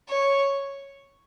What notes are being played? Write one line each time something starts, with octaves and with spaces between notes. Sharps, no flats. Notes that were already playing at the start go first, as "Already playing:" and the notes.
C#5